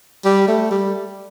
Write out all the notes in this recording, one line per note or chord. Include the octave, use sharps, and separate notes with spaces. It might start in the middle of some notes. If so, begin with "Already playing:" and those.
G3
A3
G3